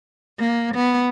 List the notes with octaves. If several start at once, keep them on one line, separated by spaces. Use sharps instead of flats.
A#3
B3